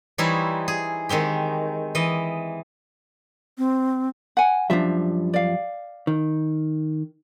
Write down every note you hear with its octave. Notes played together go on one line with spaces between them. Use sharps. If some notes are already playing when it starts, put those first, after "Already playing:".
E3 G3 D#4 E4 C5 C#5
G#4
D#3 G#3 C4 G4
E3 D#5
C4
F#5 G#5
F#2 F3 G3 D4 E5
D5 F5
D#3